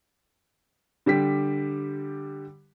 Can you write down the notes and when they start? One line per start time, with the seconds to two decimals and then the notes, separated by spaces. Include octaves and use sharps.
1.06 D3 G3 G4 B6